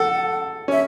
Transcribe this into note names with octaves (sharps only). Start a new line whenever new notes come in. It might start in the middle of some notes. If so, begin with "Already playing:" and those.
Already playing: A4 F#5
C#4 E5